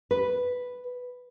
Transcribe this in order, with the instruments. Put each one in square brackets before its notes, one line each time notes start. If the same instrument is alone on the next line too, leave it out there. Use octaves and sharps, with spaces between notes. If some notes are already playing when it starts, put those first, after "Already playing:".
[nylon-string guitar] B4